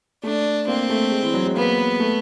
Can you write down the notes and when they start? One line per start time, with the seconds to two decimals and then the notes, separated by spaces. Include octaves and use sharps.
0.23 A3 D4
0.68 A#3 C4
0.89 A3
1.11 G#3
1.23 E3
1.34 F#3
1.45 G#3
1.55 A#3 B3
2.00 A3